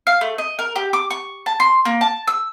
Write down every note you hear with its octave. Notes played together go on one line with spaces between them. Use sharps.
F5
A3
D#5
A#4
G4
D6
C#6
A5
C6
A#3
A5
E6